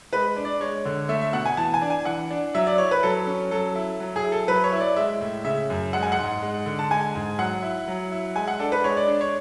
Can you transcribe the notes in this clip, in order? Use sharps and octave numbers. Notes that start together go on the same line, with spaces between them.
G#3 B4
D4
D5
G#3 C#5
D3
A3 E5
E5
B2 F#5
G#5
E3 A5
G#5
D4
G#5
E3 F#5
D4
F#3 E5
D5
E4 C#5
B4
F#3 A4
C#4
F#3 A4
E4
F#3
G#4
E4
A4
F#3 B4
C#5
E4
D5
G#3 E5
A2
C#3 E5
F#2
G#3 F#5
G#5
F#5
G#2
G#3
D3
A5
G#3 G#5
G#2
F#3 F#5
E4
F#3
E4
G#3 G#5
F#5
D4 A4
B4
G#3 C#5
D5
D4
C#5